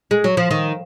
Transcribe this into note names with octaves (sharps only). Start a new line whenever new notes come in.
G#3
F#3
F3
D#3